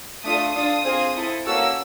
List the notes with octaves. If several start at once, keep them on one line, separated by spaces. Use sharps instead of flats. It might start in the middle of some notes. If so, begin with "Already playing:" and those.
A3 D4 F4 A4 D#6
D4 F4 A4 D#6
C4 F4 G#4
C4 E4 A4
A#3 C#4 F#4 A4 E6